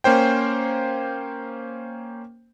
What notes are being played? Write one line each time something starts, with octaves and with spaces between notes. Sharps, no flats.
A#3 C#4 C5 G5